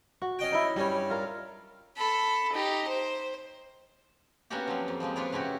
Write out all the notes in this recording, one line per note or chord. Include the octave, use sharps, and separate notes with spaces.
F#4
C#4 D#5 G5
D#4 E4
G2 G3 C#4 C#5
F4 A#4
A4 B5
D#4 G4
C5
A#3 B3 C#4 D4 F#4 G4
F3 F#3 C4
F2
F3 G#3 A#3 C4
D4 F4 B4 C#5 D5
C#3 A3 E4 F#4 G4